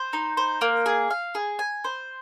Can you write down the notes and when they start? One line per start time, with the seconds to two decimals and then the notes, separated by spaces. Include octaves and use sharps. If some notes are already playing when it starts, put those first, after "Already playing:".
Already playing: C5
0.13 D#4
0.37 C5
0.61 A#3
0.86 G#4
1.10 F5
1.35 G#4
1.59 G#5
1.84 C5